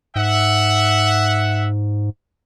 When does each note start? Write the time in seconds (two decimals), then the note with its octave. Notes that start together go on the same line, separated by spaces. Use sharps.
0.15 G#2 E5 F#5